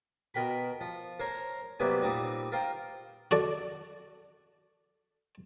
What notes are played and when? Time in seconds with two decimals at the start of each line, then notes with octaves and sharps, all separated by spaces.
0.34 B2 A#4 G5 B5
0.81 F3
1.19 A#4 C5 C#5 A#5
1.80 C3 F#3 G3 A#3 B3 C#4
2.02 A#2 G3 C4 D#4
2.52 F4 A#4 C5 G5
3.31 F#4 A4 D5